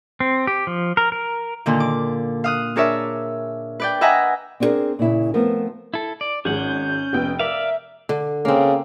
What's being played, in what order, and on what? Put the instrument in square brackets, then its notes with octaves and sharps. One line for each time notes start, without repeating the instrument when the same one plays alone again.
[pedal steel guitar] C4
G4
F3
A#4
A#4
[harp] A#2 D3 D#3
D6
F5 D#6 F#6
D4 G#4 A#4 C#5 D5 E5
B4 D5 G5
B4 D#5 E5 F#5 G#5 A#5
[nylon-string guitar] C4 D4 E4 G#4 A#4
A#2 C#3 E4
F3 A3 B3 C4 A#4
[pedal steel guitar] E4 A4
D5
[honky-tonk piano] G#1 G#3 [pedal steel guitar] C#4 F#5 [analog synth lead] G6
[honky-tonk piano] F1 B3 G5
[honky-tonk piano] A#4 [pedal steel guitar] D5 F5 [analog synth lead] E5
[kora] D3
[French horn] C#3 [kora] A#3 C4